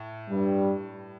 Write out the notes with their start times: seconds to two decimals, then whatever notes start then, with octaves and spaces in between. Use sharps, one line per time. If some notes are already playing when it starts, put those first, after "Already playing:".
Already playing: A2
0.28 G2 G3